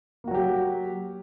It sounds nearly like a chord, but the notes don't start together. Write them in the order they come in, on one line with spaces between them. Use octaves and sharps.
A#3 F#4 F#3 G4